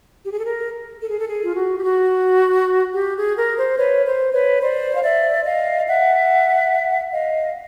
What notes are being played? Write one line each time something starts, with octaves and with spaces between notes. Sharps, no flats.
G4
G#4
A4
A#4
A4
G#4
A4
G#4
F4
F#4
G4
F#4
G4
G#4
A#4
C5
B4 C#5
C5
B4 C#5
C5 D5
F5
D5 E5
D#5 F5
E5 F#5
D#5 F5